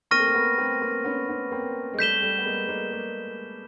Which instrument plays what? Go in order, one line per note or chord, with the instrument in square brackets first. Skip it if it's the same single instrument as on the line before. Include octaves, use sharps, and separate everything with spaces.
[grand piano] A#3 C4 [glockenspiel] C#6 F6 A#6 D#7
[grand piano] A3
A#3
A3 B3
A#3 C4
A#3 C4
B3 C#4
B3 C#4
A#3 C4
G#3
[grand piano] G3 A3 [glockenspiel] G6 B6 E7 G7
[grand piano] G3 A3
B3
G#3 A#3
G#3 A#3
G#3 A#3